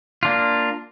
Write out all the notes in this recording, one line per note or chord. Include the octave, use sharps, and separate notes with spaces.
A#3 D4 F4